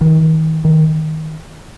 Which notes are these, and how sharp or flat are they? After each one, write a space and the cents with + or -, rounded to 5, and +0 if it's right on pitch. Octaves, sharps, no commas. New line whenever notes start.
D#3 +40
D#3 +15